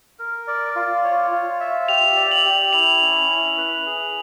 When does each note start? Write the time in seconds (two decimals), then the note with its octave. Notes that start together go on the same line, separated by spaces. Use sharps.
0.19 A#4
0.47 D5
0.76 F4
1.04 C#5
1.32 F4
1.60 E5
1.88 G4 F7
2.16 D5
2.31 F#7
2.45 G4
2.73 E4 F7
3.02 C#4
3.29 E4
3.57 B4
3.86 G#4